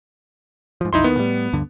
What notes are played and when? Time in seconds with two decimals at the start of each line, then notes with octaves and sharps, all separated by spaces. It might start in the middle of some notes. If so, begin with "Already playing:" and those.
0.81 G#2 F3
0.93 B1 F2 D#4 E4 C6
1.04 D#2 D#3 B3
1.17 A2 G3
1.53 D2 G2 D3